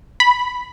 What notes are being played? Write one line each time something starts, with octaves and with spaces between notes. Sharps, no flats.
B5